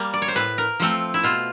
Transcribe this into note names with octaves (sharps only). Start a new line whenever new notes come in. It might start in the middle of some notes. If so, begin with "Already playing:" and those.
Already playing: G3 A#3
D5
C#5
C5
A2 B4
A#4
F3 A3 C4
E4
B2 F4